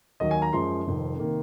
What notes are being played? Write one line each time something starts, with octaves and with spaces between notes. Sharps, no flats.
D#2 D#3 F#3 D#5
G#5
A#5
F#2 F3 G#3 C6
F1 F2 D#3
C3 D#3 A#3